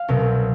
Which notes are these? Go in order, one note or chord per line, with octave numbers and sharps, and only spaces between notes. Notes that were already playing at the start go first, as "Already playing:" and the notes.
Already playing: F5
C2 B2 F#3